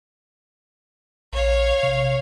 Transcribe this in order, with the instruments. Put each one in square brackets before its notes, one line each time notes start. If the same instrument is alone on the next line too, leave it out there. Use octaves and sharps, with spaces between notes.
[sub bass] A#1 [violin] C#5 F5
[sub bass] C3